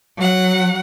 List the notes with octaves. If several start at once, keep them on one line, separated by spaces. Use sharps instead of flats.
F#3 F#5